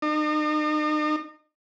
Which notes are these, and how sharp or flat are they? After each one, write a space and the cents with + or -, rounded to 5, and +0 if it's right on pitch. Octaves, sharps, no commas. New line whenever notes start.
D#4 -40